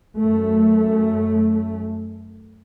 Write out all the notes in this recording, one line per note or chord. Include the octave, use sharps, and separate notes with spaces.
F#2 A3